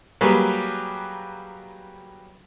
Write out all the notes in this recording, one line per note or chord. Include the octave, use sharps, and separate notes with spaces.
F#3 G3 A#3 G4 G#4 B4